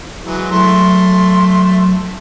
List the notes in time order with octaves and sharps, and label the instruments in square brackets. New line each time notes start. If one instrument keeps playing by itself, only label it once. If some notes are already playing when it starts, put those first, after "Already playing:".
[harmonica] E3 F#3 G#3
[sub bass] F#3 [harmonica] A3 C6